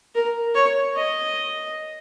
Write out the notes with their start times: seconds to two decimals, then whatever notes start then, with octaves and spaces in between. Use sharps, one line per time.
0.15 A#4
0.55 C#5
0.96 D#5